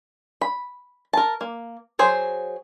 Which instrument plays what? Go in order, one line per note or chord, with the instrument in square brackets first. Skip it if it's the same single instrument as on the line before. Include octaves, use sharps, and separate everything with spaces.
[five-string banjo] B5
A#4 A5
A#3
F#3 G#4 C5